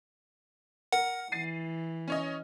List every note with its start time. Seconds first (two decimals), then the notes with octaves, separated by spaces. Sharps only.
0.93 A#4 F#5
1.32 E3 A6 C7 D#7
2.08 C#4 C#5 D#5